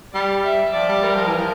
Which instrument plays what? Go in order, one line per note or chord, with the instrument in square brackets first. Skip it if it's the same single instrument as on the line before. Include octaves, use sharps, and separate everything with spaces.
[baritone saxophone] G3 [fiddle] D5
[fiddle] E5
[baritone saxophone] F3 [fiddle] D5
[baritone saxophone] G3
[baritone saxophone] G3 [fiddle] A#4
[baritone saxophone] F3
E3
F3